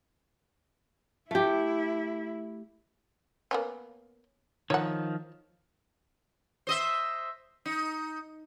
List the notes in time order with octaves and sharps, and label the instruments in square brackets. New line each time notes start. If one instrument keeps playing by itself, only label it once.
[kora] A3 G4 [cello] E4
[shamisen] A#3 B3 C#4
[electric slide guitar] D#3 F3 [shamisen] C#5 F#5
[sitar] C5 D#5 E5
D#4